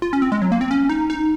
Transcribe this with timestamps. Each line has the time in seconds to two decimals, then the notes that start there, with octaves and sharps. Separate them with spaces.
0.02 F4
0.13 C#4
0.22 C4
0.32 G#3
0.42 F#3
0.52 A#3
0.61 C4
0.71 C#4
0.89 D#4
1.10 D#4